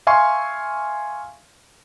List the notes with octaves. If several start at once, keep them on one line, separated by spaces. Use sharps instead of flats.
E5 F5 G#5 C6 C#6